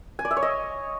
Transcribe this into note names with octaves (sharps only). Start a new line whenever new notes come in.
G#5
D5
E5
C#5
D#5